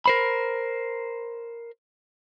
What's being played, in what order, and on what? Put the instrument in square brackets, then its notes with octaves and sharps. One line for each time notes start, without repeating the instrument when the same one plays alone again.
[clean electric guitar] A#4 C5 B5